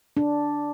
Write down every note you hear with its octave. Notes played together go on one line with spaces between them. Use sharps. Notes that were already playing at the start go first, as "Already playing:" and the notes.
D4